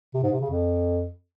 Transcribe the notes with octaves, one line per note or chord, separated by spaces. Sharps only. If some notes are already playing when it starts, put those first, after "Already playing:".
C3
G#2
C3
C#3
F2